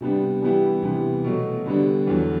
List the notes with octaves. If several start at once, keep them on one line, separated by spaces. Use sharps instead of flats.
C3 G3 B3 D4
E3 G3 B3 E4 G4
C3 E3 B3
B2 F#3 A3
D3 G3 B3 D4
E2 D3 F#3